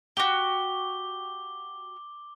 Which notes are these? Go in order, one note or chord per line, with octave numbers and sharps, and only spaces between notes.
F#4 G4 D6 G7